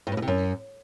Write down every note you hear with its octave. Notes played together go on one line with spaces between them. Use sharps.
G2
A2
B2
C3
F#2